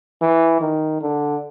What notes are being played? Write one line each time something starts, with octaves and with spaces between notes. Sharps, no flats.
E3
D#3
D3